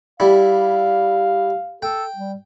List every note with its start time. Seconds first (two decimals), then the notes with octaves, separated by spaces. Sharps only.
0.20 G3 E4 F5
1.82 A4 G5
2.16 G3